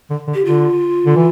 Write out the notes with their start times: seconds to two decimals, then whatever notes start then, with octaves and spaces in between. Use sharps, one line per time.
0.10 D3
0.28 D3
0.34 G4
0.45 D3 F4
1.06 D3
1.16 E3